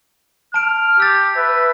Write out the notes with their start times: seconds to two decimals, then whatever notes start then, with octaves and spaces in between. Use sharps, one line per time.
0.54 A5 F6 D7
1.00 G4 E6 A6
1.37 B4 E5